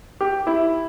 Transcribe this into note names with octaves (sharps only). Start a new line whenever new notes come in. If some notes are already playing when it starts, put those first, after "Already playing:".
G4
E4